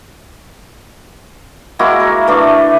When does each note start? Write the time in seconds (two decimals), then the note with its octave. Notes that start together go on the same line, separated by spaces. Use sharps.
1.79 G#3 A#3 E4 F#4
2.00 A#4
2.27 E3 A3 D4